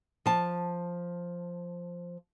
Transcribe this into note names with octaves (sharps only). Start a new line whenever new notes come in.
F3 A5